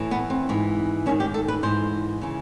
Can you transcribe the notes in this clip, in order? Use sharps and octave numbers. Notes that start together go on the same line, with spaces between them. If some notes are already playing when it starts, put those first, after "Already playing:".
Already playing: A2 E3
B3
C4
G#2 E3
G#2 D#3 C#4
G4
A4
B4
G#2 E3 C5
C#3 E3